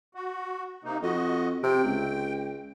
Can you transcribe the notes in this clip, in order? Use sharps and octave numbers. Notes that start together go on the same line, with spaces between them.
F#4
C3 A#3 D#4
F2 F#4 D#5
C3 G5
C#2